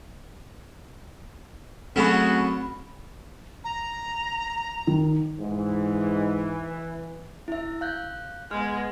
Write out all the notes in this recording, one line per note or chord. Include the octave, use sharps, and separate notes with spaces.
F#3 A3 C4 C#4 F#4 G#4 A4 B5
A#5
D#3
G#2 E3
E4 E5
F5 F#6 G6
G#3 B3 F6